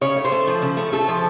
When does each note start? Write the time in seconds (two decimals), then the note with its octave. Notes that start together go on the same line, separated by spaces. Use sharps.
0.01 C#3 C#5
0.16 A3
0.24 C5
0.32 A3
0.47 F3
0.62 C#3
0.77 A3
0.93 A3 A4
1.08 F3